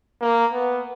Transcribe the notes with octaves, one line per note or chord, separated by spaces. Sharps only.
A#3
B3